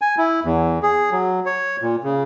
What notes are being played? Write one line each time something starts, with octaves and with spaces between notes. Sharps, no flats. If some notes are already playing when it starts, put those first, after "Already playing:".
G#5
E4
E2
G#4
F#3
C#5
A#2
C#3